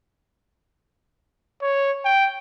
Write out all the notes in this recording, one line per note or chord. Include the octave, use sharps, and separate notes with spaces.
C#5
G5